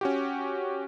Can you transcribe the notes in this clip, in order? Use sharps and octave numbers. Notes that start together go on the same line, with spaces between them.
C#4 F#4 G4